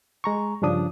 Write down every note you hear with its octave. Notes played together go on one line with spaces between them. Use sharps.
G#3 A#5 C#6
G2 C#3 F3 D4 D#6